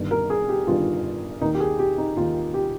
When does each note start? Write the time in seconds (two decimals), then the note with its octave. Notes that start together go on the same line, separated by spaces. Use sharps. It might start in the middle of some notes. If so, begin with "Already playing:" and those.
Already playing: G1 G2 D#3
0.11 A#4
0.30 G#4
0.49 G4
0.67 G1 G2 D#3 F4
1.41 D#2 D#3 D#4
1.55 G4
1.60 G#4
1.79 G4
1.98 D#4
2.17 D#2 D#3 F4
2.54 G4